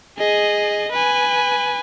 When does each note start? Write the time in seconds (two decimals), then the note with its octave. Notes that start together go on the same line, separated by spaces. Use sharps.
0.18 G#4 D#5
0.92 B4 G#5